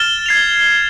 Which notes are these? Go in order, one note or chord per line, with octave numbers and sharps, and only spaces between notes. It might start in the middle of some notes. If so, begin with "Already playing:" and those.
Already playing: F6 A6 E7 G7
G#6 C7 F7